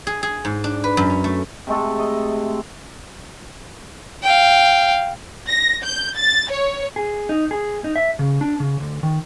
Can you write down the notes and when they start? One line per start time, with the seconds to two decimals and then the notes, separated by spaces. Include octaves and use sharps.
0.07 G#4
0.23 G#4
0.45 G#2
0.64 D4
0.84 B4
0.97 F#2
1.10 C#4
1.24 A3
1.67 C3 G#3 A3 A4
1.99 D#5
4.23 F5 G5
5.48 A#6
5.84 G6
6.17 A6
6.51 C#5
6.96 G#4
7.29 D#4
7.51 G#4
7.84 D#4
7.96 E5
8.19 C#3
8.41 D4
8.60 C#3
8.80 D2
9.03 D#3